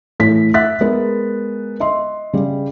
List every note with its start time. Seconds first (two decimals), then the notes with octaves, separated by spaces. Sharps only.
0.20 A2 E3 C#5 B6
0.54 E5 F#5 F#6 A6 B6
0.80 G#3 B3 A#4
1.80 D#5 E5 C6
2.33 C#3 G3